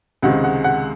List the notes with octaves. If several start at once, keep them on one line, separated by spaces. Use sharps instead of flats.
C#2 C3 D#3 G#3 F#5
F#5
F#5